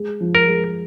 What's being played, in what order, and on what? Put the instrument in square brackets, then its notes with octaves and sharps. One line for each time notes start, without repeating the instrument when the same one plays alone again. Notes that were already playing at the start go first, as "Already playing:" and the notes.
Already playing: [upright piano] G#3
F3
[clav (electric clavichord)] A#4
[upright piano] G#3